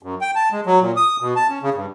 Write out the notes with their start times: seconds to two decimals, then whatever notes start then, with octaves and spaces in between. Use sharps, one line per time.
0.03 F#2
0.21 G5
0.35 A5
0.52 G#3
0.66 F#3
0.80 A#2
0.96 D#6
1.20 B2
1.36 A5
1.49 C#4
1.62 C#3
1.74 G2